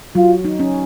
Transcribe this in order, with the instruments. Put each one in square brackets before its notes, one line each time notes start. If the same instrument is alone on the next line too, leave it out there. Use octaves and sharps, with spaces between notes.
[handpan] F#3 [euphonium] F4
[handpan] D#4
C#4